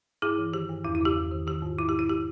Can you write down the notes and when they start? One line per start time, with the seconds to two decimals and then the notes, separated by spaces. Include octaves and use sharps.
0.22 G2 E4 G#4
0.38 E3
0.53 D#3 G4
0.69 G2
0.84 E2 E4
0.95 E4
1.01 C#3 G4
1.16 E2
1.31 D#3
1.47 D#3 G4
1.62 G#2
1.78 E2 E4
1.89 G4
1.94 B2 E4
2.10 G4